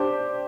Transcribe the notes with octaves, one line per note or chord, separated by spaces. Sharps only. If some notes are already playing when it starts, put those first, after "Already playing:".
Already playing: D4 G4 C5